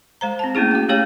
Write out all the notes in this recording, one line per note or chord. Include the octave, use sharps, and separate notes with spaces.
G#3 C5 A#5
C4 A5
A3 A#3 C#4 E4 G#4
F#4 G5
A3 C#4 G4 C#5 F5 G5